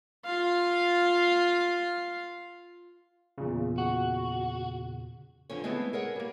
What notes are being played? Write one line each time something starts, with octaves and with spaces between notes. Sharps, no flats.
F4 F5
E2 A#2 C#3
F#4
E2 D3 F3 C#4 C#5
G#3 A3 B3 C4 E4 G#4
G#4 A#4 C#5 F#5
G3 A#3